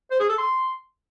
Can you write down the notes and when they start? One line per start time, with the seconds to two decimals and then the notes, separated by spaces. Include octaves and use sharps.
0.11 C5
0.20 G#4
0.29 A4
0.38 C6